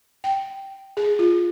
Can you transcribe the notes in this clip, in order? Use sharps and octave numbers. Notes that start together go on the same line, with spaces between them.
G5
G#4
F4